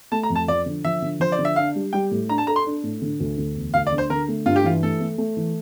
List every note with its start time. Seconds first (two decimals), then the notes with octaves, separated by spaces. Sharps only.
0.12 A3 A5
0.23 A#5
0.30 F2
0.36 A5
0.48 F3 D5
0.66 D3
0.84 F3 E5
1.02 D3
1.20 F3 C5
1.32 D5
1.38 D3
1.45 E5
1.56 D4 F5
1.75 G3
1.93 G3 G5
2.11 A2
2.29 D4 A#5
2.38 A5
2.47 A4 A#5
2.56 C6
2.66 D4
2.83 A2
3.02 D3
3.20 D2
3.38 D2
3.56 E1
3.74 D2 F5
3.87 D5
3.92 D3
3.98 C5
4.10 D3 A#4
4.28 A3
4.46 G2 F4
4.56 G4
4.64 E3 F4
4.83 A3 A4
5.01 A3
5.18 A3
5.37 E3